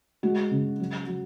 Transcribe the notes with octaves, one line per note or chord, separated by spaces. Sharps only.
G#3 F#4
C#3
F#3
F#3